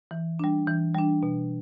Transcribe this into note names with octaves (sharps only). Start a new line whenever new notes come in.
E3
G3 D4
E3
G3 D4
B2